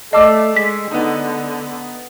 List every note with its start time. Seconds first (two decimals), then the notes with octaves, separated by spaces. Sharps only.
0.13 A3 D5 D#5 A5 D6 E6 C7
0.56 G#3 B6
0.91 D3 B3 D#4